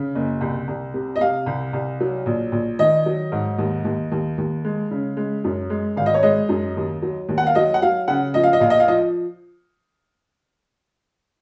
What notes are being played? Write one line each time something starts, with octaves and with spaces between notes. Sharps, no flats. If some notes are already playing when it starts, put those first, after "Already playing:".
Already playing: C#3
F#1
C2
C2
C3
D#5
C3 F5
C2
C2
F#3
A#1
A#1
D#3 D#5
F#3
G#2
D#2
D#2
D#2
D#2
G#3
C#3
G#3
F#2
G#3
G#1 F5
D#5
C#5
G#3 D#5
F#2
D#2
F#3
D#2
F#5
F5
F#3 D#5
F#5
F#3 F5
C#3 F#5
F3 D#5
F5
D#5
A#1 F5
D#5
F5
F3 D#5